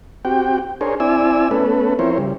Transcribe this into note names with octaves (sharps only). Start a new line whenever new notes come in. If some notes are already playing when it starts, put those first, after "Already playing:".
C4 F#4 G4 G5
D4 G#4 A#4 C5 C#5
C4 E4 D5 G#5 E6
A3 B3 C#4 A4 B4
F3 C4 E4 A#4 C5 C#5
C#3 G3